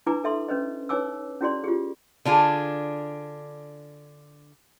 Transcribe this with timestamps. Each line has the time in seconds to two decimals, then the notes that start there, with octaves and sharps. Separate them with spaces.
0.06 D4 E4 B4 G#5 A#5 D6
0.24 A4 E5 C6
0.48 C#4 B4 C5 D#5
0.89 D#4 B4 C#5 G#5 D6 E6
1.41 C#4 E4 F#4 G#4 D5 C6
1.64 F4 G4 G#4
2.25 D3 D4 F4 G4 G#4